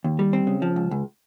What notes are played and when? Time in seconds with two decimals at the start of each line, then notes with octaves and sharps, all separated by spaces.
0.04 D#2
0.19 G3
0.33 C4
0.47 C#3
0.62 F3
0.76 C#2
0.91 C#2